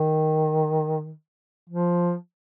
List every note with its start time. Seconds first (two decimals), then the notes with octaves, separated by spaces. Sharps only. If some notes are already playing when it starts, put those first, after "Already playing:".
Already playing: D#3
1.70 F3